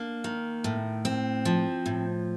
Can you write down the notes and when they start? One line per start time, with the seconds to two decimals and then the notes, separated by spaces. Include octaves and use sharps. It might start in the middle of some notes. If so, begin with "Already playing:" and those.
Already playing: A#3 D4
0.24 D#3
0.64 A2
1.05 C4
1.45 F3
1.86 A2